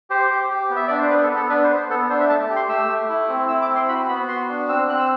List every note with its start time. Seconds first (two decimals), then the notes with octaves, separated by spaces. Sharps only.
0.10 G4 C5
0.31 G4
0.50 G4
0.70 B3
0.76 E5
0.88 D4 D5
0.98 C5
1.09 B3 B4
1.23 A4
1.30 B3
1.36 A4
1.49 D4 B4
1.63 C5
1.69 B3
1.76 C5
1.89 B3 A4
2.09 D4 C5
2.20 E5
2.29 A3 A5
2.50 G4
2.56 C6
2.69 A3 E6
2.89 A3
3.09 E4
3.29 C4
3.48 E4 E6
3.62 D6
3.69 C4
3.76 C6
3.89 F#4 B5
4.08 B3 B5
4.28 F#4 C6
4.49 D4
4.69 C4 E6
4.89 C4 F#6
4.99 E6